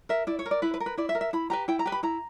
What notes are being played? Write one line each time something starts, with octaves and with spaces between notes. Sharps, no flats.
A#4 E5
E4 D5
C#5
A#4
D5
E4 B4
B4
A#4
B4
E4 D5
E5
A#4
E5
E4 B5
G4 B4 A#5
E4 G5
A#5
G4 B4
B5
E4 A#5